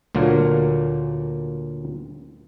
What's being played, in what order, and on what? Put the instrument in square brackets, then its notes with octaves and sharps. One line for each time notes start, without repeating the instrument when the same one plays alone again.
[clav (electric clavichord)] D2 A#2 F#3 A#3 A#4